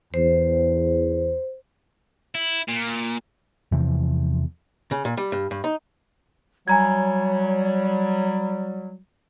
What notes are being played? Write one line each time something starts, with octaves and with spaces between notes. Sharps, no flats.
E2 C5
E4
A#2
E2 C3 E3 F3
C#3
A#2
G3
G2
G2
D#4
F#3 G3 C#5 G#5 A#5 G#6